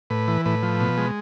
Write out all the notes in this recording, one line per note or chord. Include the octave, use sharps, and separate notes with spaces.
A2 B4
E3
A2 B4
F3
B2
G#3